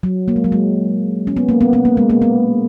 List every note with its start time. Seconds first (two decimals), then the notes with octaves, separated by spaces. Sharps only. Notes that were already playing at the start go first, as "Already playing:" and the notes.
0.03 F#3
0.28 A#3
0.36 G#3
0.44 F#3
0.52 G#3
1.27 C#4
1.37 B3
1.49 A#3
1.61 B3
1.73 B3
1.85 A#3
1.97 G#3
2.10 A#3
2.22 B3